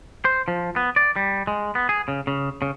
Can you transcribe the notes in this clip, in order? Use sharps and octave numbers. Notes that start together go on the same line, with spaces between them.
C5
F3
B3
D5
G3
G#3
B3
G#4
C#3
C#3
C#3